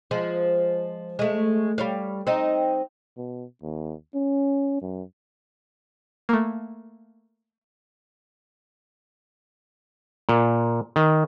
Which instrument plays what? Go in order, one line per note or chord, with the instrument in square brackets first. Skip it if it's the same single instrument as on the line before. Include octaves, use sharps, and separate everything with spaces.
[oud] F3 G#3
G#3 A3
G3 C#5 F5
C4 D#4
[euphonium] B2
D#2
C#4
F#2
[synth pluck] A3 A#3
[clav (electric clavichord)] A#2
D#3